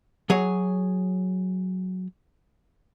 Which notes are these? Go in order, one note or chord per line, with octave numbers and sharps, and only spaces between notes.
F#3 G#4 C#5